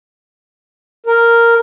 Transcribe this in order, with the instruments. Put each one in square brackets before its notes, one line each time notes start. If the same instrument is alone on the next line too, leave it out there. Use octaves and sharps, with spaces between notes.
[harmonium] A#4